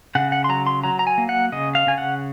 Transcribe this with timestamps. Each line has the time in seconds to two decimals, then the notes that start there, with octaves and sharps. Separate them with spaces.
0.15 C#3 F#5
0.32 F#5
0.44 C6
0.49 F#3 A#5
0.67 C6
0.84 F#3 A#5
0.99 A#5
1.07 G#5
1.18 A#3
1.29 F#5
1.52 C#3 D#5
1.75 F5
1.87 C#3 G#5
1.98 F#5